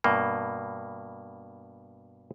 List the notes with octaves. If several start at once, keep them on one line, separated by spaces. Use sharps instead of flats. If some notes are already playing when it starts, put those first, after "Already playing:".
G2 B2 A#3